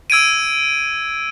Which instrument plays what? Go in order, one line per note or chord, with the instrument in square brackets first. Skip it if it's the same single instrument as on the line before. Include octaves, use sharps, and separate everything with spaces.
[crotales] E6 G#6 D7 D#7